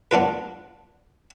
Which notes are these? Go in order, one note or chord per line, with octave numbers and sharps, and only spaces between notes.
B3 D4 F4 B4